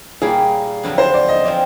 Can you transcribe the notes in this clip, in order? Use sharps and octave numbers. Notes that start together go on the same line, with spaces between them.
A#2 G3 A#3 G#4
F2 D3 F#3 B3
C5
D5
D#5
F3 G#3 C4 D5